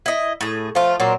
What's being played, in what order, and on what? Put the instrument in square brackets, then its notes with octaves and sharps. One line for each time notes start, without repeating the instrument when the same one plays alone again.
[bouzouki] E4 D#5
A2 G#4
[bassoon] F3 [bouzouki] A3 F4
[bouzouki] A#2 A#3 C4 [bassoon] F#3